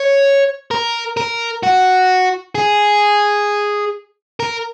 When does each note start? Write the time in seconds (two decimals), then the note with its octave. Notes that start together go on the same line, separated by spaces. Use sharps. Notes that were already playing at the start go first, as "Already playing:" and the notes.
Already playing: C#5
0.71 A#4
1.17 A#4
1.63 F#4
2.55 G#4
4.40 A#4